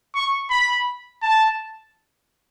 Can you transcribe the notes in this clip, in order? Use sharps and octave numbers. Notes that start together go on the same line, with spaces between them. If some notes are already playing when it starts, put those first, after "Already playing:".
C#6
B5
A5